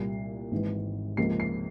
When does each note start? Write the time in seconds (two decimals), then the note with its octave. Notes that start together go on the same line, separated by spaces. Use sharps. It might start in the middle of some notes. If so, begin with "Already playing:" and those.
Already playing: C2 A#2 G3 A#3 C7
0.51 G#1 G#2 E3
1.17 C#2 C3 F3 A#3 C7
1.40 C7